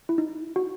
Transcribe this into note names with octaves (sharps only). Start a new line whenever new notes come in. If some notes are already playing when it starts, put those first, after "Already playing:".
E4
D#4
F#4